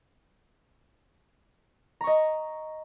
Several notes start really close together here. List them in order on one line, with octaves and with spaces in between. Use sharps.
A#5 C#6 D#5